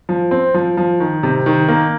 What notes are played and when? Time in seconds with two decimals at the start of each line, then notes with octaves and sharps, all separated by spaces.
0.09 F3
0.31 C4
0.54 F3
0.77 F3
1.00 D#3
1.23 C3
1.46 D#3
1.68 A#3